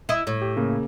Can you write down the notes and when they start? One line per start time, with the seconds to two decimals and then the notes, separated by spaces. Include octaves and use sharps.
0.09 E4 D#5
0.27 A2
0.42 G4
0.57 C#3 A#3